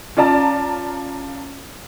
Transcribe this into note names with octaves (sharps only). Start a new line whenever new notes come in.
C#4 F4 D5 A5 A#5